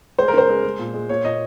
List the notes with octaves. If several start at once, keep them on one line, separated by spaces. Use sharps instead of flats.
G#3 C5
A#4
C#3 C5
G#3
G#3
A#2
G#3
A#2 C#5
A#2 D#5